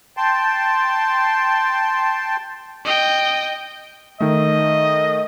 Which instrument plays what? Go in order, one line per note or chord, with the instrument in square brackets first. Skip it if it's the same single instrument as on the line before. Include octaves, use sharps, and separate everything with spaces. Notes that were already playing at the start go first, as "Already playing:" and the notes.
[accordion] G5 A5 C6
[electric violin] D#5 G5
[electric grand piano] D#3 A3 [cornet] D#5